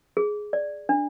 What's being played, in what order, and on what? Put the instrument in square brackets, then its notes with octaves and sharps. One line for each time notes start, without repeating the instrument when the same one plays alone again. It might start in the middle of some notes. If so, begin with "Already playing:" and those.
[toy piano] G#4
D5
D4